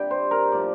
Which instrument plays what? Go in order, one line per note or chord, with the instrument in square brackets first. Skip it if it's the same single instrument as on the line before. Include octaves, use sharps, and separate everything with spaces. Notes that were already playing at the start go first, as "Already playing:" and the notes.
Already playing: [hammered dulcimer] G2 C3 G3 G5
C5
A#4
A2 F3 D5